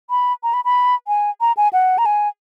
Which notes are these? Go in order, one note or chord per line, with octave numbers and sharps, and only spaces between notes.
B5
A#5
B5
B5
G#5
A#5
G#5
F#5
A#5
G#5